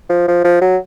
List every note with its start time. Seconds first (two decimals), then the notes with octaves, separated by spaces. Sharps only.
0.10 F3
0.28 F3
0.44 F3
0.62 F#3